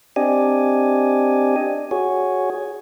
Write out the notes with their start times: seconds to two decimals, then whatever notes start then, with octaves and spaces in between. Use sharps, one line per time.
0.16 C4 D4 G4 D5 D#5 G#5
1.91 F#4 G#4 C#5